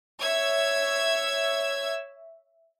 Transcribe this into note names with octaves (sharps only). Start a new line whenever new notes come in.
C#5 E5 E6 G#6